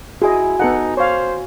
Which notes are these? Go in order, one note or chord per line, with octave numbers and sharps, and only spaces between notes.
E4 F#4 G#4 D#5 G#5
B3 D#4 A4 F#5
C5 C#5 F5